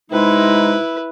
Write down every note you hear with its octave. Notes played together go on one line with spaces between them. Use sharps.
C3 G#3 D#4 E4 B4